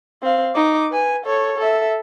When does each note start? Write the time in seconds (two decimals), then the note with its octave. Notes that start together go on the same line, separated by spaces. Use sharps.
0.23 C4 F5
0.55 D#4 D6
0.91 B4 G#5
1.24 A4 C#5
1.58 A4 E5